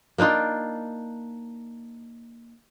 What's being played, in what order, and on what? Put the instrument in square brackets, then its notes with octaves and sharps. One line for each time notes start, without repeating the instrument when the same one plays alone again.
[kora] A#3 D4 D#4 F4